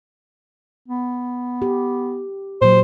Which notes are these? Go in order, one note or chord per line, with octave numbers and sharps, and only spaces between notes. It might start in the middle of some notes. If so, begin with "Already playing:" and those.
B3
G4
A#2 F#3 C5